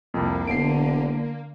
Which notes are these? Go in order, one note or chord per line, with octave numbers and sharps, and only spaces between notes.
C2 F2 A#3
E1 D3 C7 D7